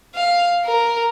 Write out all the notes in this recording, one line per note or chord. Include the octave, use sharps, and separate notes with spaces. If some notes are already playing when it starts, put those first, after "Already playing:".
F5
A#4